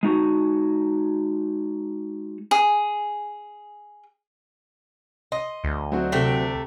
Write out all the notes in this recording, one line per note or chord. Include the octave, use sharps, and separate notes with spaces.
G#3 D#4 F#4
G#4
D#5 C6
D2
F#3 C4 F#4
C3 A3 G4